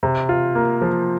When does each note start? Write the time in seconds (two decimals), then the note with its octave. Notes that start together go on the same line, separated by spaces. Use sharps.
0.03 C3
0.29 F4
0.55 A#3
0.81 F3